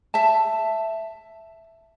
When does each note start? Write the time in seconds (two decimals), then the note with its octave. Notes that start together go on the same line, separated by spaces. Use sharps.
0.14 E5 A5